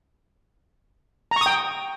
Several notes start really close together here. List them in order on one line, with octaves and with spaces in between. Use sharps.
A#5 C#6 D#6 G5